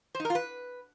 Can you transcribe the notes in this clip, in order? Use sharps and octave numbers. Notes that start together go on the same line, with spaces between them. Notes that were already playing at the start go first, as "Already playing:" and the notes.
C5
D#4
A#4
F4
B4